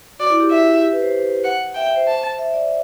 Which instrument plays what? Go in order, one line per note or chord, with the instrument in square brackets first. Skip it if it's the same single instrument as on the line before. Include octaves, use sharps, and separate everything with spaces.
[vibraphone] F#4 [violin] D5
[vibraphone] E4
G4
[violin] E5
[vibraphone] G4
B4
C5
[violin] F#5
[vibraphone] E5 [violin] G5
[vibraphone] E5
C5
[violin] A5
[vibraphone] E5
D5